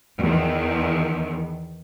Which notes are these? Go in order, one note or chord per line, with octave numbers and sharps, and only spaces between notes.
E2 D#3